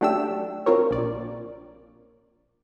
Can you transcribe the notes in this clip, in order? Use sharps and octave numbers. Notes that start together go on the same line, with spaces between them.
F#3 A3 D4 G4 E6
C4 F4 A#4 C#5
A#1 D5